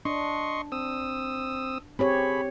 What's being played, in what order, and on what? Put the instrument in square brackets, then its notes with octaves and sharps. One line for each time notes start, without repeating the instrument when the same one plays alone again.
[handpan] D4 [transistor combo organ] D#5 C6 C#6
[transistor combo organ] C4 D#6 E6
[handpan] C4 G4 C#5 [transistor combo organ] G#4 B5